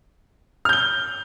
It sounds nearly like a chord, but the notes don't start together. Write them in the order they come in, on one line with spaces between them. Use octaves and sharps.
F6 G6 G7